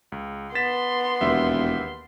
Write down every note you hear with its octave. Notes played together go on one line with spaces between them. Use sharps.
C#2
B3 C6 A6 B6 E7
E1 D#2 G4 E5